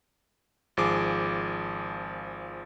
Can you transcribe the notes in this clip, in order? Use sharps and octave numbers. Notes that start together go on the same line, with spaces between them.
G#1 F3 G#4 D6